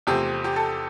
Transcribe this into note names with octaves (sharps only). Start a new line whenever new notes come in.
E2 C3 F3 A3 C4 G4
G4
A4